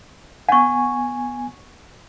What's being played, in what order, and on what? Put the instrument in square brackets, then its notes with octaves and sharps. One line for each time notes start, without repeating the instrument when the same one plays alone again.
[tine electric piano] B3 G#5 [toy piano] F#5 C#6